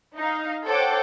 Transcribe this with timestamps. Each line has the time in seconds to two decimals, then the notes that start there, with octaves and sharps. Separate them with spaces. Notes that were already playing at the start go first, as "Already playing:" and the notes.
0.17 D#4 F5
0.66 A4 C5 C#5 F#5 G5 D6